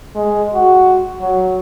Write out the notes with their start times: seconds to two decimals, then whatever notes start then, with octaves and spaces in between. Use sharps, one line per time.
0.16 G#3
0.54 F#4
1.21 F#3